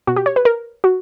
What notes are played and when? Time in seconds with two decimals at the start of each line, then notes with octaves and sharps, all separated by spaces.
0.07 B2 F#4
0.16 G4
0.26 C#5
0.36 B4
0.45 A#4
0.84 F#4